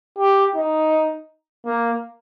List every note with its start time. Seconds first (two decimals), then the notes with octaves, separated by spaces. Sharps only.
0.19 G4
0.55 D#4
1.66 A#3